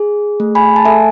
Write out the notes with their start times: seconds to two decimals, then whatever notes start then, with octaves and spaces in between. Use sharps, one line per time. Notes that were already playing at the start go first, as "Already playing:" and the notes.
Already playing: G#4
0.40 A3
0.55 G#5 B5
0.76 A5
0.85 A4 E5 G#5